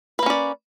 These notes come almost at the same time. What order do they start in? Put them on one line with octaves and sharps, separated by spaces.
B4 A#3 C#4 D5